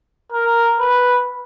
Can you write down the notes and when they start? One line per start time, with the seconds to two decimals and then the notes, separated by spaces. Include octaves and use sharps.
0.32 A#4
0.80 B4